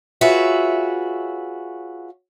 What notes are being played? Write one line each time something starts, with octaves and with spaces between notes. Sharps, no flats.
F4 F#4 G#4 B4 C#5 E5